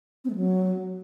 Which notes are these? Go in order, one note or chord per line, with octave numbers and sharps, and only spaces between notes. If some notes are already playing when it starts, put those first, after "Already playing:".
C4
A3
F#3